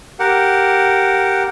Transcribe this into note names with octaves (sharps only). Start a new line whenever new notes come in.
G4 A#4 F#5